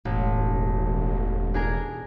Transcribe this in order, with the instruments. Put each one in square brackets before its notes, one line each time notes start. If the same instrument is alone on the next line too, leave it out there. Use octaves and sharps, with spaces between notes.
[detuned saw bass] E1 [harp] A1
[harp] D4 G#4 A#4